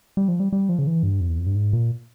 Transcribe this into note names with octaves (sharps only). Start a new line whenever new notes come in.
G3
F3
G3
G3
F3
C#3
E3
G2
F2
E2
F2
G2
G#2
A#2